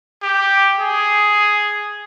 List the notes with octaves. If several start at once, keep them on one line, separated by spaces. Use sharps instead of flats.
G4
G#4